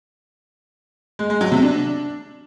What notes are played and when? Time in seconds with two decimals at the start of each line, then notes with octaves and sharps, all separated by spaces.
1.19 G#3
1.30 G#3
1.41 F#3
1.52 C3
1.62 D4